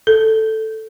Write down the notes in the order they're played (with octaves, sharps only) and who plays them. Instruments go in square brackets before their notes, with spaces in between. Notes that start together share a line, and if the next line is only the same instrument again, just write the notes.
[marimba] A4